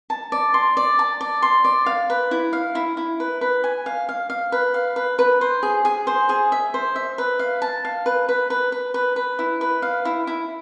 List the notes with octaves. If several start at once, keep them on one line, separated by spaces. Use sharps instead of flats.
A5
D5
C6
D5
A5
D5
C6
D5
F5
B4
E4
F5
E4
E4
B4
B4
G#5
F5
F5
F5
B4
F5
B4
B4
C5
G#4
G#4
C5
G#4
E5
C5
E5
B4
F5
A5
F5
B4
B4
B4
B4
B4
B4
E4
B4
F5
E4
E4